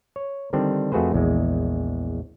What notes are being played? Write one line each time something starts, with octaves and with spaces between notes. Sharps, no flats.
C#5
D3 D#3 G3 C4 D4
F2 A3 F#4 G#4 B4 C5
A#1 E2 G#3